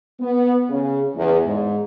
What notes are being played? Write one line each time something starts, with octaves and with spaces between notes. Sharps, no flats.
B3
C#3
E2
G#2